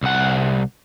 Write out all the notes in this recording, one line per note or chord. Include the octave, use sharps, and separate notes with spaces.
C2 F#5